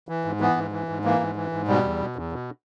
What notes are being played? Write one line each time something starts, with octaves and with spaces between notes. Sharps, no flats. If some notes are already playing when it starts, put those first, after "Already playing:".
E3
G#2
E3 B3
G#2
E3
G#2
E3 A#3
G#2
E3
G#2
B2 G3
E2
B2
E2
B2